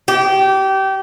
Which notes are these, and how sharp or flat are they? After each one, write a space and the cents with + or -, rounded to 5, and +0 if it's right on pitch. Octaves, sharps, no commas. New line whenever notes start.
G4 -25